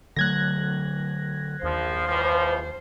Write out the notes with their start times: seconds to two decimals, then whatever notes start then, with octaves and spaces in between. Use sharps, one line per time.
0.16 D3 F#3 A3 F#6 G#6 A#6
1.63 A#1 D#2 F3 C5
2.09 C#2 E3 F3